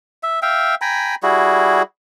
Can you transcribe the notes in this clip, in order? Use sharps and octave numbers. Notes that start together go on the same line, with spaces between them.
E5
E5 F5 G5
G5 G#5 A#5 B5
G3 E4 F#4 G#4